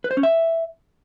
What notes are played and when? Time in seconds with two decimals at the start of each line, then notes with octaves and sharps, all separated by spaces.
0.04 B4
0.11 C5
0.17 C#4
0.23 E5